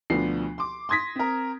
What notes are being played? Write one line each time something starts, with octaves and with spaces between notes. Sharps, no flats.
D2 B2 F3 B3 D4 C7
C6 D6
C6 D#6 G#6 A#6 B6
C4 A#4